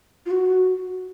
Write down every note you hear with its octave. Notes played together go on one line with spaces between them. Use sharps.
F4
F#4